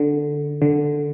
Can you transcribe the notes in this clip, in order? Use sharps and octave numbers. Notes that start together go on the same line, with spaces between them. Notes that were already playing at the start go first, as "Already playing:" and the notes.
Already playing: D3
D3